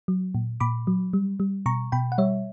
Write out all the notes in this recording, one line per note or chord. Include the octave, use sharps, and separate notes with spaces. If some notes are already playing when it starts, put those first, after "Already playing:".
F#3
A#2
A#2 B5 D6
F#3
G3
G3
B2 A#5 C#6
B2 G5 B5
F#5
G3 C#5 E5